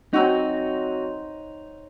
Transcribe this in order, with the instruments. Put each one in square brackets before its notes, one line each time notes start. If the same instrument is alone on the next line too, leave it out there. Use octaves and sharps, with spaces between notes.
[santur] F#3 C4 F#4 [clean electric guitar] D#4